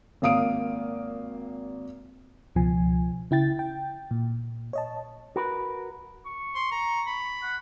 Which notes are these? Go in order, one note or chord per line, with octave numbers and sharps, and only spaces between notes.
G#1 A#3 F5 D#6 D7
C#2 B2 F3 G#5
C#3 E4 G5 A6
G5
A#2
C#5 D#5 A5
F#4 A#4 B4
C#6
C6
A#5
B5
F#5